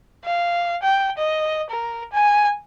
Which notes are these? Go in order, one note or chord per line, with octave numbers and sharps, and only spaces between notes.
F5
G5
D#5
A#4
G#5